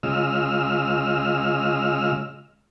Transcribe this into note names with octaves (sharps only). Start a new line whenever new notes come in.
C#3 G#3 F4 D#5 E6 F6